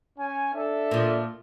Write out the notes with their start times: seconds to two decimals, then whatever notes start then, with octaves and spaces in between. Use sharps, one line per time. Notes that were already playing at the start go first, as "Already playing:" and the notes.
0.19 C#4 G#5
0.54 D4 A4 E5
0.91 A#2 F3